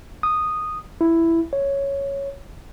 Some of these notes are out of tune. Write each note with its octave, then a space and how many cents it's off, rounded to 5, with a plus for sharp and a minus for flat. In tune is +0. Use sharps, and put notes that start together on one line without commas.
D#6 -10
E4 +5
C#5 +0